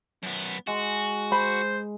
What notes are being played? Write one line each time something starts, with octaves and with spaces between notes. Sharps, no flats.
F#2 B3
G#3 F#4
C5 B5